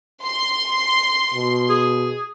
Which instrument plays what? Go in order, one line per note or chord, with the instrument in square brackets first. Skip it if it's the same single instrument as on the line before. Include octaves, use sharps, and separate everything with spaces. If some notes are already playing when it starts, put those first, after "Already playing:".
[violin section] C6
[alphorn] B2
[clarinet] G#4